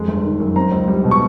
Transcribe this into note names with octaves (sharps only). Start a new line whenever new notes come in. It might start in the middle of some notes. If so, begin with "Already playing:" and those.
Already playing: F2 G#3
G1
D#3
F#2
C4 A#5
C#2
G3
B2
C#6